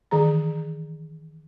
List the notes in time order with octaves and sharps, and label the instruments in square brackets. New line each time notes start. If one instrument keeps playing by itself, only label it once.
[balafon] D#3 E3 G#4 A#5